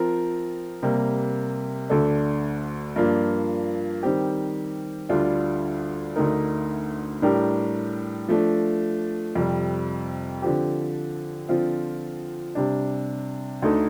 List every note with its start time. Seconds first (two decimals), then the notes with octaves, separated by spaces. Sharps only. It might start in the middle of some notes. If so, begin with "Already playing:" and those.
Already playing: F3 C4 F4 A#4
0.83 C3 G3 A#3
1.90 D2 D3 A3 D4 A4
2.96 G2 F3 A#3 D4 F4
4.03 D#3 G3 C4 G4
5.09 D2 D3 G3 D4 F4
6.16 D2 D3 A3 D#4 A#4
7.22 A2 G3 D4 G4 A#4
8.28 F3 A3 D4
9.36 F2 C3 G3
10.42 D3 F3 C4 G4
11.48 D3 F3 C4 F4
12.55 C3 G3 D4
13.62 D2 D3 A3 D#4 A4